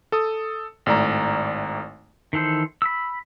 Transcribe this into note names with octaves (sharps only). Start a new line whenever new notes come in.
A4 D#6
G#1 A2 D5 A#5
D#3 E3 A4 C5
B5 E6